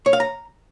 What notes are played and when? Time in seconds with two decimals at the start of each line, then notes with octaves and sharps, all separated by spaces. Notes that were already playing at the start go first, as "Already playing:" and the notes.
0.06 C#5
0.13 F5
0.20 A#5